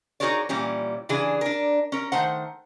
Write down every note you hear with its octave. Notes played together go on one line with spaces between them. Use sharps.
D#4 F#4 G#4 A#4 C#5 D5
A#2 E3 G3 C#4
C#3 E3 D4 G#4
D4 A#4
C#4 A#4
D#3 A3 C5 F#5